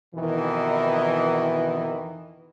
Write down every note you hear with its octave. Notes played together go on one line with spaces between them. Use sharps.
F2 B2 D#3 E3